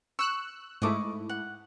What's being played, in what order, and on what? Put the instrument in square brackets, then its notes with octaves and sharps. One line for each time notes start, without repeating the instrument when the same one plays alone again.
[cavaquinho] C#6 [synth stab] E6 F#6
[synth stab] G#2 A3 E4 [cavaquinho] D#5 C#6 D6
[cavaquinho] F#5